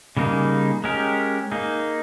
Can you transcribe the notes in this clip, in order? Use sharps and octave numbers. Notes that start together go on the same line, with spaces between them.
C#3 G3 A#3 D#4 G#4
G#3 C#4 G4 A#4
A#3 D#4 G#4